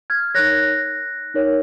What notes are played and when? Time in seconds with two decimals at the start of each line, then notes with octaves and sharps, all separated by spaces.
0.10 F6 G#6
0.35 D#4 A#4 C#5 F#6 A#6
1.34 D#4 A#4 C#5